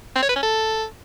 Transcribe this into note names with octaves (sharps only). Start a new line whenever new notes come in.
C4
C#5
B4
C#4
A4